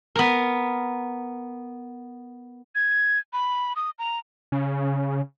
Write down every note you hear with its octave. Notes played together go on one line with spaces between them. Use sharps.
B3 A#4
G#6
B5
D#6
A#5
C#3